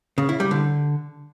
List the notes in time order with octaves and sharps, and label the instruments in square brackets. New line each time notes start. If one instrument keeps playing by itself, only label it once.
[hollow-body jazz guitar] C#3
E4
G3
D3